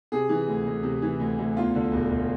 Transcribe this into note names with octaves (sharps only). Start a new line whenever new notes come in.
C3 G#4
E3
D2
D2
C3
E3
D2
D2
E2 F4
D3
E1
E1